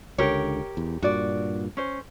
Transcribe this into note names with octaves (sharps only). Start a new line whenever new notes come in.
C#2 D3 G4 A#4 C#5
E2
G2 A#2 F#4 D5
C#4 C5